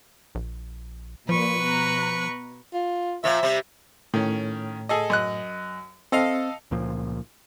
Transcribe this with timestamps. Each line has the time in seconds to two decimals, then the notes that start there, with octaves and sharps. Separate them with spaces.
0.35 A#1
1.29 A#2 F3 B4 C#6
1.60 B2 A#5 F#6
2.74 F4
3.24 A#2 F3 E5
3.43 C3 G3
4.14 A2 D#3 C#4
4.89 G#4 A4 D#5
5.10 F#2 D#5 F#6
6.12 C4 A4 D#5 F5
6.71 C#2 A#2 F3